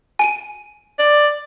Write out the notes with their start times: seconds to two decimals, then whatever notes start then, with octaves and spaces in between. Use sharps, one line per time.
0.19 G#5 D7 D#7
0.99 D5